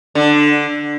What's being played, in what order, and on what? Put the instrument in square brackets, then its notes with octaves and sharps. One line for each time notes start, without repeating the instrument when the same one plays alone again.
[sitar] D3